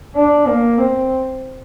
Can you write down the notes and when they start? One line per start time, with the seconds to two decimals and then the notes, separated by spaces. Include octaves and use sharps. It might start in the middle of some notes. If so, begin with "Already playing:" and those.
0.16 D4
0.48 A#3
0.78 C4